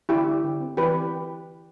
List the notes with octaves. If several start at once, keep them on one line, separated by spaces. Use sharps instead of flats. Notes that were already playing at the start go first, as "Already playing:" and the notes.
D3 E4 G4
D3
D3
C4
E3 G4 B4